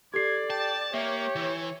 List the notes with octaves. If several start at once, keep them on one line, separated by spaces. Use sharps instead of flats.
G4 A4 D5 G#6 C7
G5 A5
A#3 G4 C#5 E5
E3